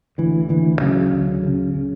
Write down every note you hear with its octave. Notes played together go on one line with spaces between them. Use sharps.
D2 E3
D2 E3
C#3 F#3
D2
C#3
C#3